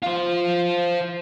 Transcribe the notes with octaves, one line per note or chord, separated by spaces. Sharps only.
F4 C5